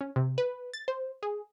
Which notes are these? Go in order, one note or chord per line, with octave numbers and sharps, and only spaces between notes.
C#4
C3
B4
A6
C5
G#4